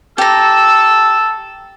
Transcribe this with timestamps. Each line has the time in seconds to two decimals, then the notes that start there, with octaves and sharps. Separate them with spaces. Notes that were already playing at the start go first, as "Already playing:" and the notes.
0.18 G4 A4 A#5 E6